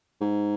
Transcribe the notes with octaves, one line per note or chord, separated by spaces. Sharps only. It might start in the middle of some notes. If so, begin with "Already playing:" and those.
G#2